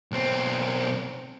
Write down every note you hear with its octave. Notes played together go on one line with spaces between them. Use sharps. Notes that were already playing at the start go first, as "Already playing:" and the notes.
B1 C4